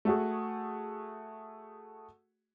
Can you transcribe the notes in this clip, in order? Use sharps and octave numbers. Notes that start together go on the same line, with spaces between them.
A3 F#4 G#4